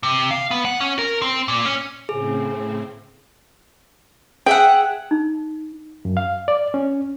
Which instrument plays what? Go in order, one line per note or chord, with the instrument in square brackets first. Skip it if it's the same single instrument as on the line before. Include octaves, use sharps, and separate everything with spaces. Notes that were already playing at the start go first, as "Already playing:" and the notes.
[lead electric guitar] C3
F5
B3
F#5
C#4
A#4
C4
A#2
C#4
[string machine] A2 C#3 C4 [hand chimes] G#4
[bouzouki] G#4 E5 F#5 [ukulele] G5
[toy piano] D#4
[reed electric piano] F#2
F5
D5
C#4